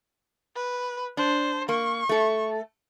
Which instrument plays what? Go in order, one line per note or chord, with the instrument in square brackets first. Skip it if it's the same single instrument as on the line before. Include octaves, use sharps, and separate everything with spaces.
[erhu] B4
[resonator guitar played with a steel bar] D4 [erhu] C5
[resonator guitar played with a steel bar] A#3 [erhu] C#6
[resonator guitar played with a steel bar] A3 A4